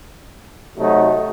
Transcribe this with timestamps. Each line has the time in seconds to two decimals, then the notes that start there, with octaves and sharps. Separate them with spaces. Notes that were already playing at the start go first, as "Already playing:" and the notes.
0.77 C3 F#3 A3 D#4 F#4